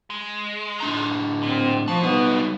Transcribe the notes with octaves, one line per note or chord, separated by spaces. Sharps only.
G#3
A2 D4 A#5
A#2 C4
B2 F3 A5
F#3 G3 B3 D#4